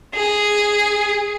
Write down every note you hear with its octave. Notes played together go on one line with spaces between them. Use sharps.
G#4